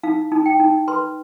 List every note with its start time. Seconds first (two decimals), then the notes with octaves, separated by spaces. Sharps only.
0.03 D#4 F5
0.32 D#4
0.46 G5
0.60 D#4
0.88 B4 C6